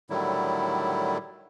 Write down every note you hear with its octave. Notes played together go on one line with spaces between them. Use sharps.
A2 D3 D#3 F#3 G3 E4